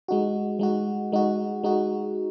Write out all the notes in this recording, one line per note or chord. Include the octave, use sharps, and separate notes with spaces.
G#3 D#4 F#4
G#3 D#4 F#4
G#3 D#4 F#4
G#3 D#4 F#4